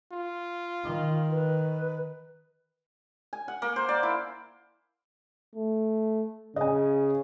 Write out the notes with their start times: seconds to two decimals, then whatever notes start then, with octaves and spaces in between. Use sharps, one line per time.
0.12 F4
0.84 D#3
1.31 B4
3.33 G#5
3.48 F#5
3.62 A#3
3.76 C5
3.89 D5
4.03 E4
5.55 A3
6.56 C#3 D#5 G#5